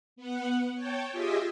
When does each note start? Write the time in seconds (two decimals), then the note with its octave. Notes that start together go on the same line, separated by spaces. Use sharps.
0.16 B3 F#5
0.75 C#5 G5 A5
1.12 F4 G4 G#4 D#5 E5